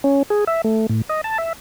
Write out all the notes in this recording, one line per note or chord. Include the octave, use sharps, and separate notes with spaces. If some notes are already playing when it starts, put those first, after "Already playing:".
C#4
G#4
E5
A3
A2
D#5
A5
E5